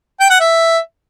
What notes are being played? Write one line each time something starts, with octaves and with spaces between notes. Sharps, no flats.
G5
F#5
E5